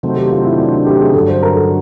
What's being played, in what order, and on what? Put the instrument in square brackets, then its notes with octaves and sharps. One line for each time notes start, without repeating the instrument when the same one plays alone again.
[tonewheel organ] C3 D#3 F#3 A3 C4
[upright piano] G4
F4
E4
D4
D4
G4
G#4
[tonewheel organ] G2 D3 F#3 [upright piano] A4
[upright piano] C5
A#4
A4